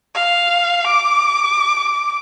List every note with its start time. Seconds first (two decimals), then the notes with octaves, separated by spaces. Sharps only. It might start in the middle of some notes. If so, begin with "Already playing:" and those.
0.15 F5
0.87 D6